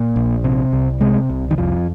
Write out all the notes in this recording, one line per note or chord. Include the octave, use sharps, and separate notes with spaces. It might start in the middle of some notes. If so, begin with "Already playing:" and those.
Already playing: A#2
A#1
C3
C2
C3 G#3
C2
D#3
F2 F3